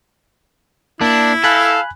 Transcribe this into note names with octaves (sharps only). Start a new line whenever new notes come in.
A#3 D4 E4
A4 F5 G#5 B5 F#6